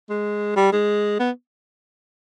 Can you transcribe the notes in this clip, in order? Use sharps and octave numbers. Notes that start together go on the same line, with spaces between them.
G#3
G3
G#3
B3